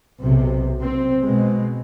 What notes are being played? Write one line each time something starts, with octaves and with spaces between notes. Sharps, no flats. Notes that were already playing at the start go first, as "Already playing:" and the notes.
B1 C3
C4
B2 G#3